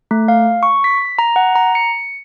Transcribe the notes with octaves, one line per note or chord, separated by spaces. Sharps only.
A3
F5
C#6
B6
A#5
F#5
A#5
C#7